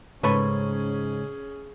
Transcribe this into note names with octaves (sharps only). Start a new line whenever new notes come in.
G#2 C#3 C#4 G#4 A4 B4 C#5